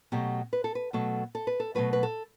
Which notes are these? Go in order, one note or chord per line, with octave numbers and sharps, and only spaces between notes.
B2 F#3 A3 G4
B4
A4
B4
B2 F#3 A3 A4
A4
B4
A4
B2 F#3 A3 B4
B4
A4